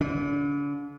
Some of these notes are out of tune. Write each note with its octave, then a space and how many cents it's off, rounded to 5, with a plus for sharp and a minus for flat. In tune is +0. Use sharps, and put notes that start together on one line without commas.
D3 -40 D4 -40